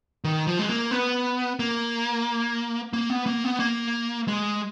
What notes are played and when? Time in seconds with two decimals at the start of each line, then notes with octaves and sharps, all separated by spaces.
0.24 D#3
0.47 F3
0.59 G#3
0.69 A#3
0.91 B3
1.59 A#3
2.93 A#3
3.10 B3
3.26 A#3
3.44 B3
3.60 A#3
4.28 G#3